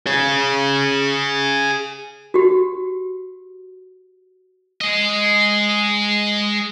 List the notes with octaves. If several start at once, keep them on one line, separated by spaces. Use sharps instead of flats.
G#4 C#5
F#4 G4
G#3 D#5